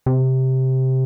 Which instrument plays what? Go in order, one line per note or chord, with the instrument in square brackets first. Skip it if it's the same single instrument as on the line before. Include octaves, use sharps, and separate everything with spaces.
[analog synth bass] C3